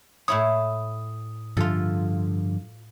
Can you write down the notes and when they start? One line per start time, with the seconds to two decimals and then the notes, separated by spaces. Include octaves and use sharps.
0.28 A2 E4 C#5 D#6
1.57 G2 D3 F3 F4 A4